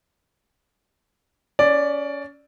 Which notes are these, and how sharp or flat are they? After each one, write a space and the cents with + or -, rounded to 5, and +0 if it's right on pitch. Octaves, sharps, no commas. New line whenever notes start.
C#4 +25 D5 +0